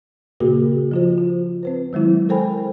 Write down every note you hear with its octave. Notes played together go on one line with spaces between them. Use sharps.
A#2 C#3 A#3 F#4 G#4 A#4
F3 F4 C5
F4
C4 B4 C5
D#3 F#3 G#3 E4
A4 A#4 C5 G5 G#5 B5